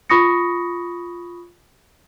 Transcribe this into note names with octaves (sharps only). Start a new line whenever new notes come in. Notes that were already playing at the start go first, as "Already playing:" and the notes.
F4 B5 C#6 D#6 A#6 C#7